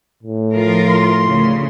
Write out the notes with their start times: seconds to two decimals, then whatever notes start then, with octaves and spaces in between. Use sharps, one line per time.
0.23 A2
0.55 F3 F4 A#4
0.88 C6
1.26 D2 C#3